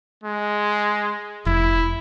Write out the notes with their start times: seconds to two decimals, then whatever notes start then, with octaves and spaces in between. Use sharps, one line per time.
0.24 G#3
1.46 F1 E4